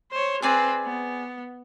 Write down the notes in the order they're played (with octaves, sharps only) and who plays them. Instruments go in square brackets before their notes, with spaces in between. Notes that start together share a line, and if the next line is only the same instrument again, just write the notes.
[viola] C5 C#5
[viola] C4 B4 [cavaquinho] G#4 D5 G#5
[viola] B3